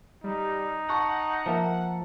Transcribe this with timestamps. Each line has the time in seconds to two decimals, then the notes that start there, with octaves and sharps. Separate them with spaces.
0.24 G3 D#4
0.88 F#5 A5 C#6
1.46 F3 A#3 A#4 E5 A5